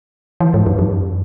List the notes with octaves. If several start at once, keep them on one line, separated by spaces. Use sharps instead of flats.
E3
G#2
F#2
F#2